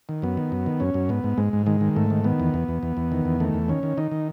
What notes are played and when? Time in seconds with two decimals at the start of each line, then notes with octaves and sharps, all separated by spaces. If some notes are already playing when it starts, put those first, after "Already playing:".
0.09 D#3
0.22 F#2 B3
0.37 D#3
0.52 F#2
0.66 D#3
0.80 F#2 C#4
0.94 F#2
1.09 G#2 B3
1.24 G#2
1.38 G#2 G#3
1.53 G#2
1.66 D#3 G#3
1.81 D#3
1.96 G#2 A3
2.10 D#3
2.24 D#3 B3
2.40 E2
2.54 E2
2.68 E2
2.83 E2
2.97 E2
3.12 D#3
3.25 E2
3.40 D#3 A3
3.54 E2
3.68 D#3 C#4
3.83 D#3
3.97 D#3 D#4
4.11 D#3